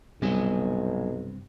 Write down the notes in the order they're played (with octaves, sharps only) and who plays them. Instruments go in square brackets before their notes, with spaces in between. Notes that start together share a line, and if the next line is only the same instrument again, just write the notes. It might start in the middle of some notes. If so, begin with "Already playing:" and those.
[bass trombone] B1 [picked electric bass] G2 C3 [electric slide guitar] G3 B3 G#5